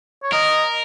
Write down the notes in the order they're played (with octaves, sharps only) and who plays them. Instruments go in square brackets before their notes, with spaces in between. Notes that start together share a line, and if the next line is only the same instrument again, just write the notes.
[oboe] C#5
[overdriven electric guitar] A#4 [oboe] D#5